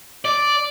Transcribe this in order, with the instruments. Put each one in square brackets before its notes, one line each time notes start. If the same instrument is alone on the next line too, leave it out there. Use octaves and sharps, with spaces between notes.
[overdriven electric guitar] D5